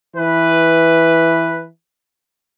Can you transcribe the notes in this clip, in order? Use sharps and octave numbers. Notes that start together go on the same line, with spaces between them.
E3 B4